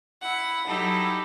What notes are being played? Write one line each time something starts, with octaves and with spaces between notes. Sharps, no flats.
E4 F#5
F#3 D#4 E4 G4 A4